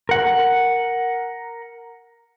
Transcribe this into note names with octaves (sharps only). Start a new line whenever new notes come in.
A#4 F#5